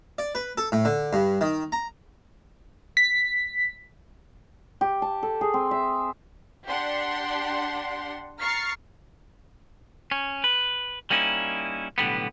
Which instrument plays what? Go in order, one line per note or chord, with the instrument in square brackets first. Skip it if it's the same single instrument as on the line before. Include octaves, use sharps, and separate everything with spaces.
[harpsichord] D5
B4
A4
A2
D3
G2
D#3
A#5
[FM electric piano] B6
[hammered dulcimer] G4
A5
A4
G#4
C4
E5
[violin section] D4 G4 F#5 C6
A#5 C#6 F6 A6 C7
[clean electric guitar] C#4
B4
G3 A#3 C#4 D#4 E4
B1 A2 D3 G3 B3